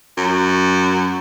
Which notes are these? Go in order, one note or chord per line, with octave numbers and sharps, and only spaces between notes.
F#2